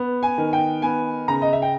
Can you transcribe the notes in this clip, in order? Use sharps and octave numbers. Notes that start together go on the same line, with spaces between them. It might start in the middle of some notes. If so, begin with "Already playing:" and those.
Already playing: B3
G#5
D#3
G5
B3 G#5
C#3 A#5
D#5
E5
G5